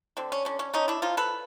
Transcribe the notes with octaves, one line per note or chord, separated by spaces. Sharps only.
D3 C4
C#4
D3 C#4
C#4
D3 C#4 D#4
D4 E4
F3 D#4 F4
A4 B4